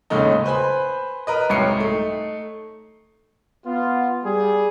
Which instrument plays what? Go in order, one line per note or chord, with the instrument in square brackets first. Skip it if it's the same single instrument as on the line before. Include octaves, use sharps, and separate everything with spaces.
[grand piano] D#2 A2 C#3 G#3 A3 D#4
B4 C5 G#5 B5
A#4 B4 D#5
C2 G#2 C#5 G5 C7 C#7
A3 D#4
[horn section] B3 F4
G3 G#4